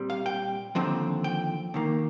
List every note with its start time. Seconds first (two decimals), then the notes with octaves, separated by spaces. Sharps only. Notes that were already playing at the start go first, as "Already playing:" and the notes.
Already playing: A#2 G3 C4
0.10 F5
0.26 G5
0.75 D#2 D3 F3 C4
1.24 G5
1.74 D#2 D#3 A#3